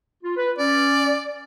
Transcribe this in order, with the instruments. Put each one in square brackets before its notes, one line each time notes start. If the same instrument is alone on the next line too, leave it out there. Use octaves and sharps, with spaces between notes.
[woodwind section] F4
B4
[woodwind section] C#4 [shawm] D5